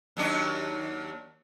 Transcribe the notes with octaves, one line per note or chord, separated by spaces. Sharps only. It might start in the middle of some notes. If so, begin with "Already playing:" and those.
D#2 F#3 D4